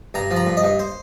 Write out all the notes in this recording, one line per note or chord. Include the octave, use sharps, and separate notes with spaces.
G2 A#5
F3
A#5
G2
D#5
G2
C5